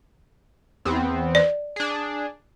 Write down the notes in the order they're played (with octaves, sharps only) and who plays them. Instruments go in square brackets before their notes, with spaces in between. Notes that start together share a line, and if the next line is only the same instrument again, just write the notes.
[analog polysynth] E2 B3 C4
[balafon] D5
[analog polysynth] D4 G#4